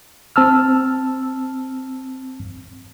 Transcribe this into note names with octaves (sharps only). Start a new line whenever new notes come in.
C4 A5 E6 F6